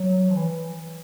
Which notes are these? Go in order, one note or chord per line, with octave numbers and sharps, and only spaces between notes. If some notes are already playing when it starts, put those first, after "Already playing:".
Already playing: F#3
F3
E3